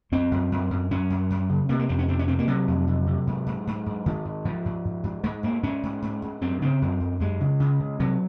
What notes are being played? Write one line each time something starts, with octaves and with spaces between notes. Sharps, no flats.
F#2 C4
F#2
F#2
F#2
F#2 C#4
F#2
F#2
C#3
C3 A#3
A#3
F2 C4
C#4
C3 C4
C#4
C3 C4
A#3
C3 F#3
F2
C3
C3
G#2
G#2
G#2
G#2
G#2 D#3
G#2
G#2 F3
G#2
G#2
G#2
G#2 G#3
G#2 A#3
G#2 C#4
G#2
G#2
G#2
F#2 C4
C#3 C4
F#2
F#2
F#2 G#3
C#3
C#3
C#3
C3 F#3